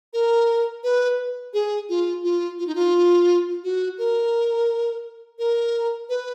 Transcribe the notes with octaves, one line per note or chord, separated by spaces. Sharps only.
A#4
B4
G#4
F4
F4
F4
D#4
F4
F#4
A#4
A#4
B4